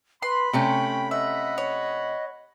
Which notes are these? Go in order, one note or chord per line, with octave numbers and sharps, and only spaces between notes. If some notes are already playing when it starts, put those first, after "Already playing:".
B4 B5 C6
C3 A3 C#4 G5
D#5 E5 F#5 B5
C#5